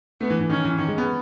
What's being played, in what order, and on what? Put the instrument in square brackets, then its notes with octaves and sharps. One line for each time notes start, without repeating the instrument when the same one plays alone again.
[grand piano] A3 [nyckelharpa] B3
[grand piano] E3
E3
[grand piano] D#3 [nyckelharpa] C#4
[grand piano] E3
[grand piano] D#3 [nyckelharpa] C#4
[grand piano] G#3
B3